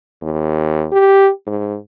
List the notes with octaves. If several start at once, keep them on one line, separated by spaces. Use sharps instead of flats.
D#2
G4
G#2